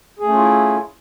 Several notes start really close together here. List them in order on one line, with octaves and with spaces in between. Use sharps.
G#4 A3 C#4 F4 E4